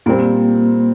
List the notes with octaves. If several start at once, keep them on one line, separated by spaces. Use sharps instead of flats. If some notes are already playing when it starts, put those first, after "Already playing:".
A#2 G3 A#3 C4